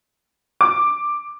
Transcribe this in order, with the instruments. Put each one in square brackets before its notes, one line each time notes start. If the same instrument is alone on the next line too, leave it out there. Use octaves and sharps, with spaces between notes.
[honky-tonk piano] D6